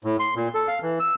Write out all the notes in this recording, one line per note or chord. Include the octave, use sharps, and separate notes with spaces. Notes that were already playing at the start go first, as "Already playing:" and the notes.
A2
C6
A#2
A4
F5
E3
E6